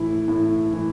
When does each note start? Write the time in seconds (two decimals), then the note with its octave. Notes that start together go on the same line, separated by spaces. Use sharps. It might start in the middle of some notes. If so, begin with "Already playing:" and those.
Already playing: A2 E3 E4
0.28 A2
0.73 E3